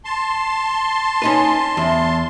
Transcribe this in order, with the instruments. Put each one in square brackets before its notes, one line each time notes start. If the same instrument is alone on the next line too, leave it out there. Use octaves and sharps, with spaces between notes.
[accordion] A5 C6
[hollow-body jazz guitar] C#4 D#4 B4
E2